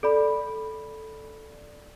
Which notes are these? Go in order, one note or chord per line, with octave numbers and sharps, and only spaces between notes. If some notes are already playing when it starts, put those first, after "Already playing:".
A4 D5 B5